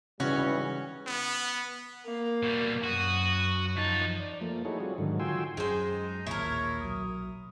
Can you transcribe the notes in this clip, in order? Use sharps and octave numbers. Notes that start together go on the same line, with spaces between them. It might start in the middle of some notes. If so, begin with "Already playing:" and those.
G#2 C#3 E3 G3 C#4 F#4
B3
A#3
B2 G3
F#2 F#4 C#6 D#6
F3 D#4 A5
D5
F3 A3 A#3
D#4 E4 F#4 G#4 A4 C#5
G3 C4 F4 F#4 G#4
G#2 D3 D#3 F#3
F4 F#4 G5 G#5 C6 E6
F#2 G#3 D#4 C5
A1 D#2 A#2 E4 A#4 C#5
B1 F#3 D#6